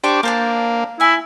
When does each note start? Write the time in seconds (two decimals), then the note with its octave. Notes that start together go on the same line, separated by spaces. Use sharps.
0.04 D4 G4 C5 C#6 D6
0.23 A#3 D4 C5 A5
1.00 E4 G#5 E6